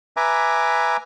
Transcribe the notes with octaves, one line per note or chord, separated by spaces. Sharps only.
B4 E5 G#5 A#5 D6